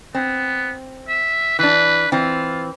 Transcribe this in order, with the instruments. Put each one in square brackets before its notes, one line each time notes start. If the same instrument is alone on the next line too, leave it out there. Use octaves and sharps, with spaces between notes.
[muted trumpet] B3 [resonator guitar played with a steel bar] C4
[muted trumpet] E5
[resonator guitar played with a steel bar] E3 D4 [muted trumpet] B4
[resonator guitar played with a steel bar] E3 C4 [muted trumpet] F4